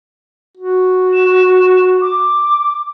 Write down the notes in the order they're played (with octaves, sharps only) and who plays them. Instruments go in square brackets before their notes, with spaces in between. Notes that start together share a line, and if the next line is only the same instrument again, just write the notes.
[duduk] F#4
[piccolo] E7
D6